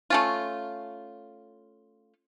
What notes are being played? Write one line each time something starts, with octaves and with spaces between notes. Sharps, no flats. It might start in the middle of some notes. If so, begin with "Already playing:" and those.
A3 C#4 F4